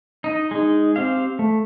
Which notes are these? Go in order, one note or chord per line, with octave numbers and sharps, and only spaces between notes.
D#4 D#5
G#3 D#4
C4 G4 F5
A3